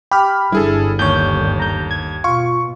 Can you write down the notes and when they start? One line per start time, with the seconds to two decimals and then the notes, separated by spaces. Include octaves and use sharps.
0.11 G4 B5 F6
0.52 G1 G2 E4 G#4 A4
0.99 D#2 C#5 G6
1.60 A#5 G6
1.91 G#6
2.24 B2 F4 C#6